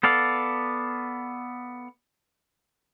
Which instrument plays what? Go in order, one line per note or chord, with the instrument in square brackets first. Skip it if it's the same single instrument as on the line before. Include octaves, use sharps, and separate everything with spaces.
[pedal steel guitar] B3 A4 D5 F5